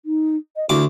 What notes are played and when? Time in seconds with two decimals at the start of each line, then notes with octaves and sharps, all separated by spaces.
0.05 D#4
0.56 D#5
0.69 D2 E4 D6